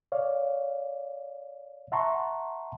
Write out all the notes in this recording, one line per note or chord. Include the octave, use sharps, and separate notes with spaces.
C#5 D5 F5
E5 F#5 A5 A#5 C6 C#6